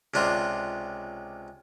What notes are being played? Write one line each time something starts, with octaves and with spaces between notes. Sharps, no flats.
C#2 C3 D4 F4